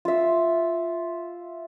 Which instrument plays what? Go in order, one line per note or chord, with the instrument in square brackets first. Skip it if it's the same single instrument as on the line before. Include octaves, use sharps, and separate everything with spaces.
[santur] F4 E5